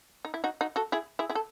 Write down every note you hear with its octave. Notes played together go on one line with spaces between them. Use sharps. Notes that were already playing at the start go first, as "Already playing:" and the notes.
D#4
E4
D#4 F#4
D#4 F#4
F#4 A4
E4 G#4
E4 G#4
E4 G#4
A4